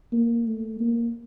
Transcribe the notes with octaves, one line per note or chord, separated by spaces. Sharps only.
A#3
A3
A#3